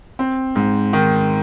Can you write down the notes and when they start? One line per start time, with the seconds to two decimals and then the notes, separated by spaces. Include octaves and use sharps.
0.19 C4
0.56 G#2
0.93 D#3